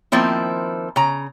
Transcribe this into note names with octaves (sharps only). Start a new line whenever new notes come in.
D#3 F3 A#3 C4 E4
C#3 A#5